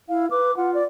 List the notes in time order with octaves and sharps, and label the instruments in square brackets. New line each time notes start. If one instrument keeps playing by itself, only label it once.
[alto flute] E4 [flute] F5
[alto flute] B4 [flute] D6
[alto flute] F4 [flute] F#5
[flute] D5